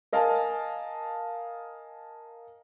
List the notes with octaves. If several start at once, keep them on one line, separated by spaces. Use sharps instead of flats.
A#4 D#5 F5 G#5 A5